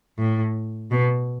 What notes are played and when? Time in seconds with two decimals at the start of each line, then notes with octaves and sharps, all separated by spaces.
0.18 A2
0.91 B2